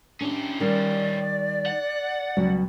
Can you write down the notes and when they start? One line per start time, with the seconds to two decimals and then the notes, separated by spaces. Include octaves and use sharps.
0.21 C#4 D4 G4
0.60 D#3 G3 D5
1.66 F#5
2.37 C#2 B2 F#3 G3